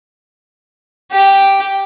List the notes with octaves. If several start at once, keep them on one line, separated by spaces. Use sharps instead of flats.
G4